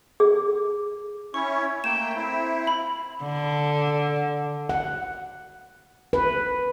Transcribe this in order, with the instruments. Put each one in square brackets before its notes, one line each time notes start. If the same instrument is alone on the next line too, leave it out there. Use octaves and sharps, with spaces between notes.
[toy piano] G#4
[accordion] C#4 E4 C#5 [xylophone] C#6
[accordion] A3 A#3 G5 [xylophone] E7
[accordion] C4 E4
[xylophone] B5
[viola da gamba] D3
[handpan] F#5
B4